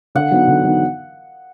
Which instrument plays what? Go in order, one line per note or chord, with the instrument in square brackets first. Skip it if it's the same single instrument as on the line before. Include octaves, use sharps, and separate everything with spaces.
[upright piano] D3 [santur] F#5
[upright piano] F#3 B3 D#4
D3
F#3 B3 D#4